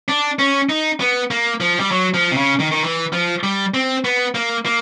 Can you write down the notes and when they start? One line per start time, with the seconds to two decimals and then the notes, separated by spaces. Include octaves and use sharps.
0.08 D4
0.39 C#4
0.69 D#4
1.00 B3
1.31 A#3
1.60 F3
1.80 G3
1.91 F#3
2.14 F3
2.32 C3
2.37 C#3
2.60 D#3
2.71 D#3
2.83 E3
3.13 F3
3.43 G3
3.74 C4
4.05 B3
4.35 A#3
4.66 A#3